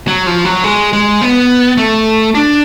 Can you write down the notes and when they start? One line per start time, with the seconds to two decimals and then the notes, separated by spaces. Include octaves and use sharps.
0.08 F#3
0.27 F3
0.45 F#3
0.64 G#3
0.93 G#3
1.22 B3
1.78 A3
2.35 D4